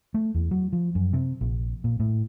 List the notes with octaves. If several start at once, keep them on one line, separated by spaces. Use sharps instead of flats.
A3
E2
F#3
F3
F#2
C3
A#1
A#2
A2